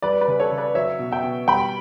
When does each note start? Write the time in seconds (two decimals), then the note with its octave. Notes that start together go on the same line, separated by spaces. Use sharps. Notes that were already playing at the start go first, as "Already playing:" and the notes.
0.02 G3 B4 D5
0.21 B4 D5
0.28 C#3
0.40 A4 C#5
0.51 C#3
0.58 B4 D5
0.75 F#3 C#5 E5
0.99 B2
1.11 E5 G5
1.24 B2
1.48 G3 G5 B5